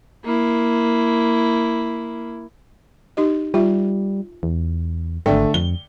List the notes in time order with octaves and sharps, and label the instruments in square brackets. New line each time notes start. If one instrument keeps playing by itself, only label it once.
[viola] A#3 E4
[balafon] D#4 G4 D#5
[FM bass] G3 [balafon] F4 E5
[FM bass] E2
[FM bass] G#1 [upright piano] D3 A3 [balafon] D5 G5
[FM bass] F2 [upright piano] G7